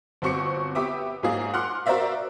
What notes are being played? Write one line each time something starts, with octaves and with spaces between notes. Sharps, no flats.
G1 C4 F#4 C#6 D6 C#7
B3 G4 E5 D6 D#6
G#2 F#3 A#3 F4 G#4
F#5 C6 D6 F6 F#6
F#4 A#4 C5 D5 E5 F5